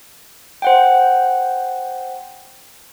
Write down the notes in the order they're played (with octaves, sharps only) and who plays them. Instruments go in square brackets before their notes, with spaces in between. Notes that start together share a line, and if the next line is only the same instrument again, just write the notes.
[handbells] C5 F#5 G5